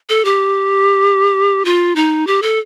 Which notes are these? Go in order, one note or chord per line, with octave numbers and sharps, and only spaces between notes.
A4
G4
F4
D#4
G4
A4